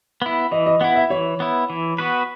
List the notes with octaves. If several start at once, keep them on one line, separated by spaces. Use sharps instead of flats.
B3 E4
E3 D#5
D#5
B3 E4 F#5
E5
E3 C#5
B3 E4
E3
B3 F#4 B4